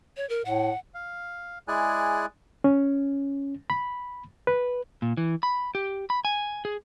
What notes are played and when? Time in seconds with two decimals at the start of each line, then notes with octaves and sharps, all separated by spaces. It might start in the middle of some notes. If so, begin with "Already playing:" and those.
0.17 C#5
0.29 A#4
0.45 A2 F#5
0.94 F5
1.68 G#3 E4 G#4 D5 G#5 F#6
2.64 C#4
3.70 B5
4.47 B4
5.02 A#2
5.17 E3
5.43 B5
5.75 G4
6.10 B5
6.25 G#5
6.65 G#4